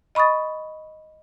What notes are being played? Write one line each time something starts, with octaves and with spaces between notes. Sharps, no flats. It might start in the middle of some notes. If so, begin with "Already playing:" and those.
D#5 B5 C#6 D#6 A6